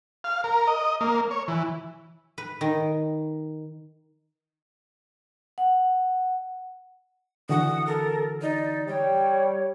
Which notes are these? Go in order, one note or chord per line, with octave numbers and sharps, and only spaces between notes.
F5
A#4
D#5
A#3
C#5
E3
B4
D#3
F#5
D3 E3 F#4 F#5 D#6
A4 A#4
D#4 D5
G3 C#5 G5